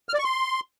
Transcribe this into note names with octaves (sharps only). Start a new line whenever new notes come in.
F6
D5
C#6
C6